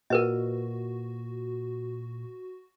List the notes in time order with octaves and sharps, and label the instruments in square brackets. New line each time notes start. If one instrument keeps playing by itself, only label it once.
[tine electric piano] A#2 [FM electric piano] F#4 [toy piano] A#4 B4 D#5